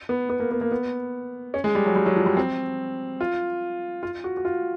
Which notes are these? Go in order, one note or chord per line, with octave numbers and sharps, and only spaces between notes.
B3
B3
A#3
B3
A#3
B3
C#4
G#3
G3
F#3
G3
F#3
F3
G3
C4
F4
F4
F#4
F#4
F4